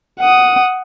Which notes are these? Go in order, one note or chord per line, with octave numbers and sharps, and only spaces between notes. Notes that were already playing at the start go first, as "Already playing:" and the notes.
F#5 D#6